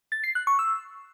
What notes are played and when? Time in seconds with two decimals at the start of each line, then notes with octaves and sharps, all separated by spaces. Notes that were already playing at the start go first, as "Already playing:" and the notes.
0.12 A6
0.24 C7
0.35 F#6
0.47 C#6
0.59 E6